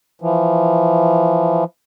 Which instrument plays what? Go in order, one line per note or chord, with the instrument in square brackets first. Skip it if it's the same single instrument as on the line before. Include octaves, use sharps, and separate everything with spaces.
[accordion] E3 F3